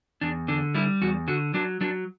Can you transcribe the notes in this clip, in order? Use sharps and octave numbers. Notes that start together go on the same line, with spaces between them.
E2 D4
D3 D4
G3 E4
E2 F#4
D3 F#4
F#3 D4
F#3 D4